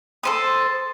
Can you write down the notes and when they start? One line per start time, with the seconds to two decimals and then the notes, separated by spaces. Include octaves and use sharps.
0.23 A4 C5 D#6